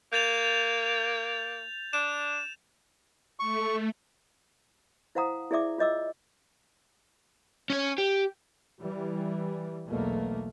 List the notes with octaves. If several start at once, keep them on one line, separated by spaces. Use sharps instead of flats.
A#3 G6 A6 F7
D4 E7
A3 C#6
E4 C5 F5 F#5 A#5 D#6
E4 G#4 D5 E5 D6
F4 C#5 D#5 D6 E6
C#4 C#5
G4
E3 G3
B1 E2 B2 A3 A#3